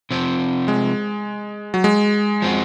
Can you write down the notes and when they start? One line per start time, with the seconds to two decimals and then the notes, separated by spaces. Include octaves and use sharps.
0.11 C3 F3 C4
0.68 G#3
1.74 F#3
1.84 G#3
2.42 F3 C4 F#4